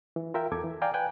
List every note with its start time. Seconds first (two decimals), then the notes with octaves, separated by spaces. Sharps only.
0.16 E3
0.34 F4 A#4 E5 G5
0.52 E2 A4 D6 G#6
0.64 E3
0.81 D5 F5 G5 G#5 A#5
0.94 B4 G5 G#5 F#6